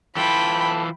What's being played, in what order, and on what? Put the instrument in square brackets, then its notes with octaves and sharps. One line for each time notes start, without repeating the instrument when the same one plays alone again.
[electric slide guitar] E3 F4 [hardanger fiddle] E4 G5 [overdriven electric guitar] A4 [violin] B5